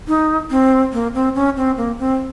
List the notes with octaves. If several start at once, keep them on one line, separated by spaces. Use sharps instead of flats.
D#4
C4
A#3
C4
C#4
C4
A#3
C4